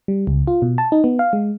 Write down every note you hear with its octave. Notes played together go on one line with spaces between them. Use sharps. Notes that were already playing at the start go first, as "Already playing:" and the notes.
G3
C#2
F4
B2
A5
D#4
B3
F5
G#3